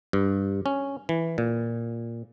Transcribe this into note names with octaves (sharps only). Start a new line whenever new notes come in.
G2
C#4
E3
A#2